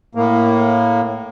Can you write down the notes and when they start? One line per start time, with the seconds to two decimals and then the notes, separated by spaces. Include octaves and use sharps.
0.15 A2 A#3